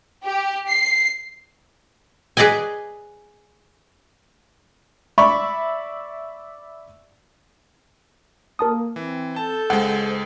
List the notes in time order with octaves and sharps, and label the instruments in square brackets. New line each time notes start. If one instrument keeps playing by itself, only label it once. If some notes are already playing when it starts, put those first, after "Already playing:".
[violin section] G4
C7
[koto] G#4 B4 D5 D#5 G#5
[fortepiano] D5 E5 B5 C#6
[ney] A#3 [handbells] A#4 A5 D#6
[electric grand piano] E3 [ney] C4
[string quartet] A4 G6 [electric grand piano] A5
[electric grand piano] C#2 G#3 [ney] C5 [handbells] F#5